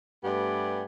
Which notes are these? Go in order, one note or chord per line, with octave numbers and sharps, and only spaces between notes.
G2 A3 B3 G4 D5 G#5